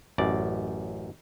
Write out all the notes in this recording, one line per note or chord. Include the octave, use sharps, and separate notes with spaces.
A1 F#2 D5